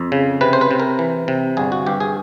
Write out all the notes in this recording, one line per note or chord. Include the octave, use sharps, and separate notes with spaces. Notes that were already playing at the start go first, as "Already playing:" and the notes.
Already playing: F2
C#3
C3 B4
C5
B4
C3
A#4
E3
C3
G1 G#4
F#4
G2 G4
G#4